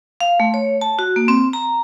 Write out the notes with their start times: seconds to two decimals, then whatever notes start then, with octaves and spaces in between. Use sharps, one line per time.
0.21 F5
0.40 A3
0.54 C#5
0.81 A5
0.99 F#4
1.16 A#3
1.28 C4
1.53 A#5